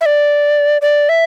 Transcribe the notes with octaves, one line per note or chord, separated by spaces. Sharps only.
E5
D5
D5
E5